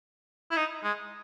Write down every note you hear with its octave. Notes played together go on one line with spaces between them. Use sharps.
E4
D#4
G#3